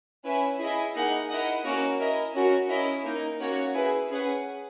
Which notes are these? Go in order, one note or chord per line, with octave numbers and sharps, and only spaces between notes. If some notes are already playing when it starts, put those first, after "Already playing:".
C#4 E4 B4 E5 G#5
E4 G#4 D#5
A#3 D#4 G#4 D#5 F#5
E4 A#4 D#5 F#5
A#3 C#4 F#4 A#4
E4 A#4 D#5
C#4 F#4 A#4
C#4 E4 A#4 D#5
A#3 D#4 A#4
A#3 C#4 F#4 C#5 F#5
E4 G#4 B4
C#4 G#4 B4 F#5